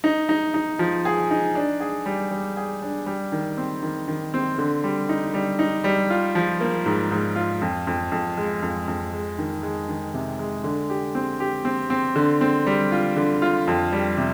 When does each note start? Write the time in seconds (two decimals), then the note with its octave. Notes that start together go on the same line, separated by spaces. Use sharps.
0.04 D#4
0.29 D#4
0.54 D#4
0.79 F3
1.05 G#4
1.31 D#4
1.55 D4
1.80 G#4
2.06 G3
2.31 G3
2.57 G#4
2.82 D4
3.06 G3
3.32 D#3
3.57 C4
3.83 D#3
4.08 D#3
4.34 C4
4.58 D3
4.84 G3
5.09 D#4
5.34 G3
5.59 D#4
5.84 G3
6.10 F4
6.35 F3
6.61 A#3
6.86 G#2
7.11 G#2
7.36 F4
7.62 F2
7.87 F2
8.12 F2
8.37 G#3
8.62 F2
8.88 F2
9.13 G#3
9.38 D#3
9.63 G#3
9.89 D#3
10.14 C3
10.39 G#3
10.64 D3
10.89 G4
11.15 C4
11.40 G4
11.65 C4
11.90 C4
12.16 D3
12.41 C4
12.67 G3
12.92 F4
13.16 D3
13.42 F4
13.67 F2
13.92 G3
14.18 C3